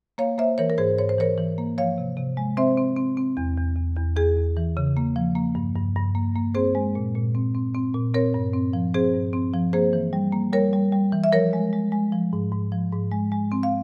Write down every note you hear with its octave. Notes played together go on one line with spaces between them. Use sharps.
A#3 C#5 F5
A#3 C5 E5
E3 A#4 C#5
A#4
G#2 G#4 C5
G#2 C#5
C5
E3 A#4 C#5
E3
A#3
F3 C#5 F5
C3
C3
G#3
C4 C5 E5
C4
C4
C4
E2
E2
E2
E2
E2 G#4
E2
E3
C#3
A#3
F3
A#3
G2
G2
G2
A#3
A#3
C4 G#4 C5
G#3
A#2
A#2
C4
C4
C4
A#2
C4 A#4 C#5
G2
C4
F3
C4 G#4 C5
G2
C4
F3
A#3 G#4 C5
E3
G3
A#3
G3 A#4 C#5
G3
G3
E3
E5
F3 A#4 C#5
G#3
G#3
G#3
F3
G#2
G#2
F3
G#2
G#3
G#3
C4
F5